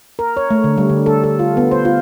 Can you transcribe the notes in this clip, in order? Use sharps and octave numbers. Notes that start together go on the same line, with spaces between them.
A#4
C#5
A3
D3
G3
D3
A4
A4
F4
B3
C5
F4